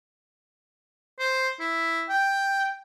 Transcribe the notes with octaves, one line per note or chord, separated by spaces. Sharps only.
C5
E4
G5